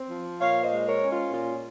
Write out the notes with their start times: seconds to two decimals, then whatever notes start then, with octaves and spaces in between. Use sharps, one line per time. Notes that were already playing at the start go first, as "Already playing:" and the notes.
Already playing: C4
0.10 F3
0.41 A#2 C#5 F5
0.64 C5 D#5
0.72 G#3
0.87 A#4 C#5
1.02 C#4
1.10 F4
1.33 A#2 F4